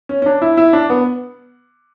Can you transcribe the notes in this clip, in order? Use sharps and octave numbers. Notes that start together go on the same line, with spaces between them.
C#4
C#4
D4
E4
E4
D4
B3